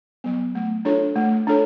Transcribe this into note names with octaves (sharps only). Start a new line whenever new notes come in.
F#3 B3
A3
D4 F4 A4 C#5
A3
D4 F4 A4 C#5